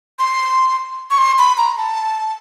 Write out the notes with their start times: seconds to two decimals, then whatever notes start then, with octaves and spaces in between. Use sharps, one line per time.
0.19 C6
1.11 C#6
1.18 C6
1.39 B5
1.58 A#5
1.77 A5